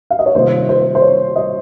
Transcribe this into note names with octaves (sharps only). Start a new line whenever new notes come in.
F5
D#5
C#5
C3 D#3 G3 A#3 F4 C5
C5
C5
C#5
D#5